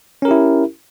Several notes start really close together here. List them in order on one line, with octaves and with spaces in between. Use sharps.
C#4 A#4 G4 E4